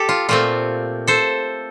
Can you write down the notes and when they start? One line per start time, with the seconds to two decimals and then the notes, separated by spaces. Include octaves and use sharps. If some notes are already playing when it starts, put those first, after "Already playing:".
Already playing: G4 A4
0.09 F4
0.29 A#2 A3 C4 F4
1.07 A4 C5